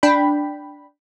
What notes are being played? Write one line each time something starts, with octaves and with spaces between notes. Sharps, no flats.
D4 G5 B5